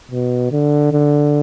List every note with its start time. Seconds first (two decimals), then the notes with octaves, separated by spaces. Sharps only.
0.11 B2
0.52 D3
0.92 D3